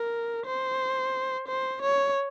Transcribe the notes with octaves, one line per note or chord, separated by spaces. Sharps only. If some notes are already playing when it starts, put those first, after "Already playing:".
Already playing: A#4
C5
C5
C#5